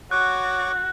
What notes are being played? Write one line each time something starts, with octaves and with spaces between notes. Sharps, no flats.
F#4 C#5 C#6 D6 F#6